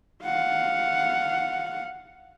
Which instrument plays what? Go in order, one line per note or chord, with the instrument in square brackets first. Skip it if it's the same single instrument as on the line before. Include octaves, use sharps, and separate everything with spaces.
[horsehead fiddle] F5 F#5